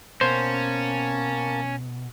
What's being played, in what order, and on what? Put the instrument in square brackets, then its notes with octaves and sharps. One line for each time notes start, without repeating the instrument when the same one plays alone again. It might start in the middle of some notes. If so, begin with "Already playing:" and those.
[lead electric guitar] B2 [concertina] A#3 A5 [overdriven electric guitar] C#4 [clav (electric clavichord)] C5